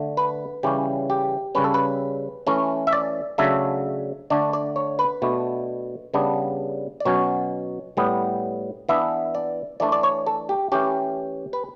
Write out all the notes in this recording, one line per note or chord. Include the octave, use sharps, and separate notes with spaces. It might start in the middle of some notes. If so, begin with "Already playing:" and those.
Already playing: D3 A3 D4
B4
C#3 E3 G3 C#4 G4
G4
C#3 G3 C#4 B4
A4
B4
E3 A3 C#4
E5
D5
C#3 F#3 A3 D4 E5
D3 A3 D4 D5
D5
C#5
B4
B2 A3 D4
C#3 G3 B3 D4
D5
B2 F#3 C#4 C#5
A2 G3 B3
E3 B3 D4 E5
D5
E3 A3 D4 D5
D5
C#5
A4
G4
E3 A3 C#4 G4
B4